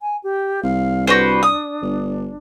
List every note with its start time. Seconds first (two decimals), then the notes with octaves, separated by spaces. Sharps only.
0.01 G#5
0.24 G4
0.63 C2 F5
1.07 D4 F#4 B4 C5
1.43 D#6
1.82 G1